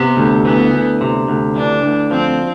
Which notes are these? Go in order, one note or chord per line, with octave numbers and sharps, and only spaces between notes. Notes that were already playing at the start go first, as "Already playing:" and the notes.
Already playing: C3 B3
D2
E3 B3
D2
C3
D2
E3 D4
D2
F3 C4